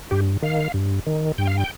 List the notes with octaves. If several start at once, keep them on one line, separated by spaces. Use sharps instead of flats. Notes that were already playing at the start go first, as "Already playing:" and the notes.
G2 G4
D#3 F5
G2
D#3
G2 G5
F5
G5